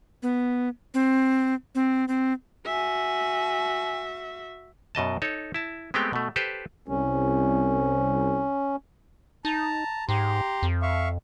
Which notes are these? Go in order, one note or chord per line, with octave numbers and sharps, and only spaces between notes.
B3
C4
C4
C4
F#4 E5 G#5
F#2 B2 D#5 A5
D#4 A4 C#5
E4 A5
G#3 A3 B3 C4 G4 G5
B2 A3
G4 A4 B4 C5
C2 C#4
D#4 A5 A#5
G#2 G4 A#5 C6
F2
E5 F5 C#6